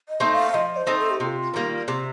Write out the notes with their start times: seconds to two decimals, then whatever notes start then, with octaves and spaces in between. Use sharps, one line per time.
0.09 D#5
0.20 A3 C4 D#4
0.32 F5
0.54 F3 D#5
0.77 C5
0.87 A3 C4 D#4
0.98 A4
1.11 G4
1.20 C3 F4
1.54 D#3 G3 A#3
1.88 C3 C4